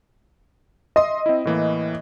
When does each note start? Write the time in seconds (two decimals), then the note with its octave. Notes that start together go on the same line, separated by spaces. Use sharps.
0.96 D#5 E5 C6 D#6
1.26 C4 E4
1.45 A2 E3 A#3